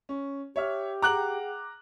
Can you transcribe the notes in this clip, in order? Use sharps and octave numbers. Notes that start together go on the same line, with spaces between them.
C#4
G4 C#5 E5 F6
G#4 F#5 G5 A#5 D6 F#6 F#7